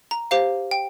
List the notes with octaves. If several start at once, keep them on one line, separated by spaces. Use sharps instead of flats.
A#5
G4 C5 F5
G5